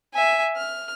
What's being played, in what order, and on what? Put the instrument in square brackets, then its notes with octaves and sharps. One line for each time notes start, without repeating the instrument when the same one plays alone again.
[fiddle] E5 G#5
F6